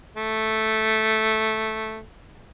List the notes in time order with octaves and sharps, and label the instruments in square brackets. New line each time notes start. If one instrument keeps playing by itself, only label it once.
[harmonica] A3